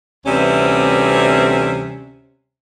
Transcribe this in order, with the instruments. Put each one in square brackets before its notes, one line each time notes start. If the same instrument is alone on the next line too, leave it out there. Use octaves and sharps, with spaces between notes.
[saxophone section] D2 C3 E3 G3 C4 C#4